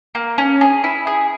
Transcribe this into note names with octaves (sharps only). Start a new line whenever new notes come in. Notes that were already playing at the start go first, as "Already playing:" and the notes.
A#3
C#4
G#4
E4
G#4